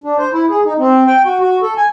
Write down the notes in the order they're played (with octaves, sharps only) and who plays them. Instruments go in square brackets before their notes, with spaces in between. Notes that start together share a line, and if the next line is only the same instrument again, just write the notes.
[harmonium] D4
C5
E4
G#4
D#4
C4
G5
F#4
F#4
A4
G#5